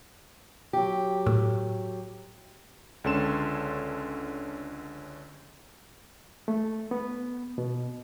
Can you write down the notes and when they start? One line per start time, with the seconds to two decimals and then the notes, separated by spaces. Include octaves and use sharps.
0.73 F#3 G4
1.26 A2
3.04 C#2 D3 C#4 A4 C6 E7
6.48 A3
6.91 B3
7.58 B2